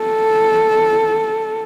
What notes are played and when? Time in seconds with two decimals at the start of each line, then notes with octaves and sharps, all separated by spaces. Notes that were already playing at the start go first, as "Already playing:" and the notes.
Already playing: A4